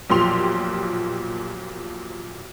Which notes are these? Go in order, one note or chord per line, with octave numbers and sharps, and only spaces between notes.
B1 F2 A#2 G4 C6 F7